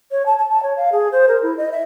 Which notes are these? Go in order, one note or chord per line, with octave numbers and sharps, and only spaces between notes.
C#5
A5
A5
A5
C#5
F5
G#4
C5
A#4
E4
D#5
E5